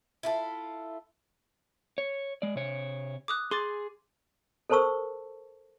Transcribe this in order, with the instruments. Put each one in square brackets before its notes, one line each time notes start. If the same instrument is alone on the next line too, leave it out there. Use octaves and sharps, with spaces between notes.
[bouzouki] E4 F4 A4
[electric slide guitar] C#5
G#3 D5
C3 C#5
[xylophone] D6 D#6 F#6
[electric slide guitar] G#4 [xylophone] C6 D6 A6
[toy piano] A4 A#4 C5 A5 C#6 E6